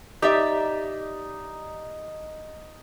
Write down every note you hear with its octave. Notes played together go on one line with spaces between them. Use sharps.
D#4 G4 D5 E5